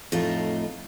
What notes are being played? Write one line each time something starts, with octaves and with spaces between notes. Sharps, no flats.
F2 A2 A3 D#4 F4